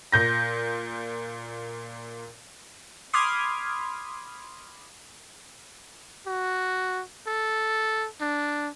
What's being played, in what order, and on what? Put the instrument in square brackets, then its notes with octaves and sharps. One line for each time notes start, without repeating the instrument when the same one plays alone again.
[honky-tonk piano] A#2 G6 A#6
[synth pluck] B5 C6 D6 D#6 F6 G#6
[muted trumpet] F#4
A4
D4